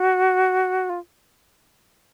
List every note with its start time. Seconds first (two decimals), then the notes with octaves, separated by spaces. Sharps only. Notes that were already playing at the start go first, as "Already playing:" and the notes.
Already playing: F#4
0.90 F4